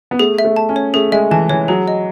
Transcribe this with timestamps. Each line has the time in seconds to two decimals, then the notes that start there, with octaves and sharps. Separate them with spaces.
0.11 B3
0.19 A3 G#4
0.38 E5
0.45 A3
0.56 A5
0.69 C#4
0.76 C#5
0.94 A3 G#4
1.12 G#3 E5
1.31 E3 A5
1.50 E3 C#5
1.68 F#3 G#4
1.88 D#5